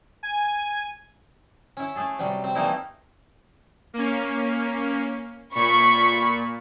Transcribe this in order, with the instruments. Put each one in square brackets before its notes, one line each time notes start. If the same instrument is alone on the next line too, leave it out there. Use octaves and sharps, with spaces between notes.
[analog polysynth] G#5
[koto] C#4 E4
A3 G#4 A4
C3 F#3 G3
C4
E3 G3 A3 A#3 D#4 E4
[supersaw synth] A#3 C#4
[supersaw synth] A#2 [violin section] B5 C#6